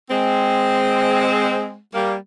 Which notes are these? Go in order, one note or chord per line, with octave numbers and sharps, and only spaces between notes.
G#3 C4
G3 A#3